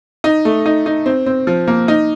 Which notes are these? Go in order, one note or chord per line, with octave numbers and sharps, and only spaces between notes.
D#4
A3
D#4
D#4
C4
C4
F3
A#3
D#4